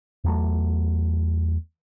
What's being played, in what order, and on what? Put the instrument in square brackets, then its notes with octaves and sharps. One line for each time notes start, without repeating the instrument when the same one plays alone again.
[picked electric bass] E2 F#3 A3